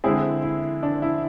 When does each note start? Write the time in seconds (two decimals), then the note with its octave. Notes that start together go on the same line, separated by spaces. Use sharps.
0.04 D3 G#3 C4 E4 G#4
0.43 E4
0.83 D4
1.02 E4